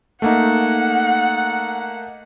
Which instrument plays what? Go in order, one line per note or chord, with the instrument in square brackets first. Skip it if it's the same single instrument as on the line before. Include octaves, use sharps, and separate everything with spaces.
[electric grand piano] A3 A#3 D#4 [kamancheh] F#5